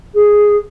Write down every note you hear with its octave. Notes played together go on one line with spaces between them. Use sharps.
G#4